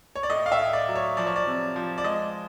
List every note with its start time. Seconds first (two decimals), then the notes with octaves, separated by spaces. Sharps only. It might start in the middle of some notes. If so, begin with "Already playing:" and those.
0.15 C#5
0.23 D5
0.30 A2 D#5
0.46 F5
0.52 E5
0.59 A2
0.73 D5
0.88 F#3
0.95 C#5
1.17 F3 D5
1.27 C#5
1.36 D5
1.47 C3
1.76 F3
1.98 D5
2.04 G#3 D#5